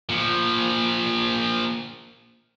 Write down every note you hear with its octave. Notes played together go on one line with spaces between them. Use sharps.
A#2 F3